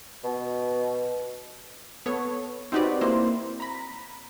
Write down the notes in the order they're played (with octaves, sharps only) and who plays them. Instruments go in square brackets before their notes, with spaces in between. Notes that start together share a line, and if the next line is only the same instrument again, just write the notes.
[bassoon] B2
[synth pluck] B3 A4 C#5
C4 D#4 F#4 G4 B4 D5
A#3 C4 E4 C5
A#5 B5